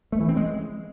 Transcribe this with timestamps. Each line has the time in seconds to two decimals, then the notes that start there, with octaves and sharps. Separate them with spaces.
0.12 A3
0.21 E3
0.29 C4
0.37 G#3